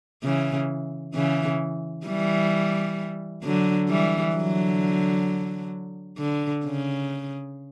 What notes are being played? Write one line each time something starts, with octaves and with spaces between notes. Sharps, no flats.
C#3 E3
C#3 E3
E3 G3
D3 F#3
E3 G3
D3 F#3
D3
C#3